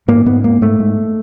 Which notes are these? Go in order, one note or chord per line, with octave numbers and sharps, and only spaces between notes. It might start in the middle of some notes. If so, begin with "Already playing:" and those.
G#2 A#3
G#2 B3
G#2 A#3
G#2 A3
G#2